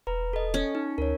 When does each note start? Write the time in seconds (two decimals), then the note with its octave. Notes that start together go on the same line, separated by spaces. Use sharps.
0.07 E1 B4 A#5
0.33 A4 D#5
0.54 C#4
0.75 D#4
0.98 D2 A#4 C#5